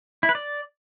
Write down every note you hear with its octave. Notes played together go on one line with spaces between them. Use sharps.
E4
B4
D5